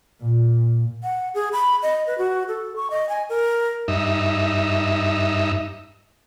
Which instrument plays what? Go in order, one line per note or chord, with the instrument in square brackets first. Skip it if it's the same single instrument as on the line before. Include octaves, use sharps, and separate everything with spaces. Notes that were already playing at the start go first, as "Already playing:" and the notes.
[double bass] A#2
[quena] F#5
G#4
B5
D#5
B4
F#4
A4
C#6
D#5
G#5
A#4
[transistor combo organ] G2 D#4 E5